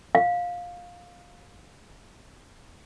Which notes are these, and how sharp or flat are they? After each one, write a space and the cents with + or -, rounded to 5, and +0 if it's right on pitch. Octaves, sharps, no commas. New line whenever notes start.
F5 +15